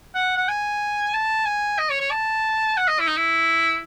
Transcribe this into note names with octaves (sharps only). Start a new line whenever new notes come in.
F#5
F#5
G#5
A5
G#5
D#5
C#5
C#5
A5
F#5
D#5
E4
D#4
E4